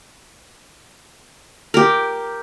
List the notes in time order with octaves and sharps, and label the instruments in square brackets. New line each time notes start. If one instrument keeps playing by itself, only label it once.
[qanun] G4 A#4